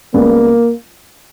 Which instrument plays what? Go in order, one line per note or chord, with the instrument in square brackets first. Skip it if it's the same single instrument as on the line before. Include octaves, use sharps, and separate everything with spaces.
[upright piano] C#2 C#3 G3 B3 [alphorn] A#3